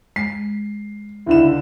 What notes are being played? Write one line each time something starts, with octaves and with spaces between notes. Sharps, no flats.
G#3 C7
C#2 D3 E4 E7